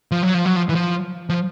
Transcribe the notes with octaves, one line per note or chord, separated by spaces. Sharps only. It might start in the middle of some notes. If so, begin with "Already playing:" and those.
F3
F#3
F3
F#3
F3
E3
F3
F3